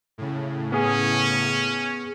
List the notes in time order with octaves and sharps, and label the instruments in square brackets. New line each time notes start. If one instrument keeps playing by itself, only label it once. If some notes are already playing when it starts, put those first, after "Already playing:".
[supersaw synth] A2 C#3
[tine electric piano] B3 G#4 [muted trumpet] C#4